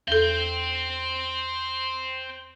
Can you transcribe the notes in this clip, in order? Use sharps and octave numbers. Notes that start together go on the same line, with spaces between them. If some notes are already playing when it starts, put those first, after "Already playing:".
E2 A4 C5 G5